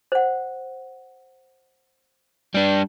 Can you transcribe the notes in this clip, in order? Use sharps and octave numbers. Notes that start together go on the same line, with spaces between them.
C5 F#5
G3 D4